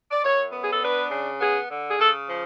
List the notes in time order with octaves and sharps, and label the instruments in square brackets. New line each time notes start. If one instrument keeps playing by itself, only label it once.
[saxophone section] D5
F#2 C#5
B3
G#4
A4
D4 B4
C#3
B3 G#4
D3
G#4
C#3 A4
F3